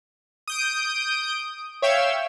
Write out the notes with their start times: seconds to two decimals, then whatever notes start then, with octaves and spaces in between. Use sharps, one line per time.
0.48 D#6 G6 D7
1.82 C#5 E5 F5 G5 E6